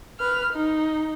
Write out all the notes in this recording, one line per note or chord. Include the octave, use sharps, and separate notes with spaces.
B4 F6
D#4